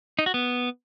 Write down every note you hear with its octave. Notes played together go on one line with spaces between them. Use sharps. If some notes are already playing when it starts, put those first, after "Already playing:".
D#4
F#4
B3